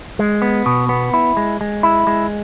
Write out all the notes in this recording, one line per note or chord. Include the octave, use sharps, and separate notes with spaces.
G#3
B3
B2
B3
E4
G#3
G#3
E4
G#3